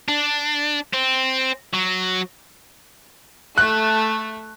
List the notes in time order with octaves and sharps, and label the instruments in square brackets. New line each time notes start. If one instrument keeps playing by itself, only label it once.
[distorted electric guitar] D4
C4
F#3
[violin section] A3 [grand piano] F#6